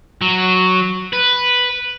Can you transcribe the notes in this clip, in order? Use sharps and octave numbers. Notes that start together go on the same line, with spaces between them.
F#3
B4